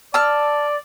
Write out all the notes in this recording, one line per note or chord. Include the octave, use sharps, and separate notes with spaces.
D5 A5 E6 F6